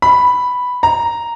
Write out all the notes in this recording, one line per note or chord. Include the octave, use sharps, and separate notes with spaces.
B5
A#5